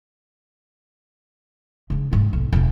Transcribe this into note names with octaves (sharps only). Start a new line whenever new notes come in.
C#3 D4
D2 G#2
B1
E1 D3